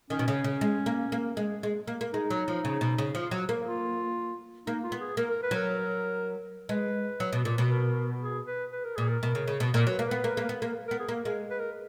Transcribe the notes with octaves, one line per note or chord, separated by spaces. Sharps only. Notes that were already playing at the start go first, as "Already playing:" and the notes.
D#3 C#4
B2
C#3
C#3
G#3
A#3
A#3
G#3
G#3
A#3
A#3
G#3 D#4
F#3
F3
C#3
B2
C#3
F3
F#3
A#3
F4
A#3 D#4
F4
B3
G#4
A#3 A#4
A#4
B4
F#3 A#4
G#3 B4
F#3
B2
A#2
B2
A#4
G#4
B4
B4
A#4
A#2 G#4
A#4
B2
C#3
C#3
B2
A#2 A#4
F#3 B4
A#3
B3 B4
A#3
A#3
B3
A#3
B3 A#4
G#4
A#3
G#3 A#4
B4
A#4